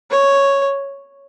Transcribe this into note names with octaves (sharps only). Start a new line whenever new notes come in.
C#5